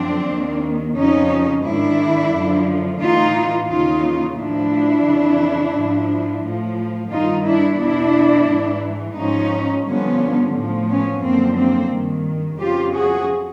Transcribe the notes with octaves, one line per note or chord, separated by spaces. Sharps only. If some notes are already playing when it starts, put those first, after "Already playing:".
Already playing: F#2 D3 F3 C4 D4
D#2 D#3
F2 C#3 F3 C#4 D#4
G#2 D#3 D4 E4
F#2 D3 F3
A2 E3 D#4 F4
D#2 C#3 E3 D#4 F4
A2 F3 D4 E4
F2 C#3 E3
G#2 F3
A2 F3
G2 D#3 D#4 F4
D4 E4
E2 B2 D4 E4
G#2 E3
G#2 F3 C#4 D#4
G2 D3 F3 B3 C#4
A2 F3
B3 C#4
F#2 D3 F3 A#3 C4
A#3 C4
G2 D#3
F2 C#3 F3 F4 G4
F#4 G#4